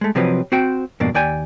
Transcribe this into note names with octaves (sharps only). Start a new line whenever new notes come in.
G#3 A3
C3 F3 F#3 C4 B4 D#5
C4 F#4 C5 G5
F2 G#2 B2 A#3 D4
D#2 D5 G5 G#5